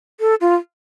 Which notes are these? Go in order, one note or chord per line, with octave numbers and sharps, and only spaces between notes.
A4
F4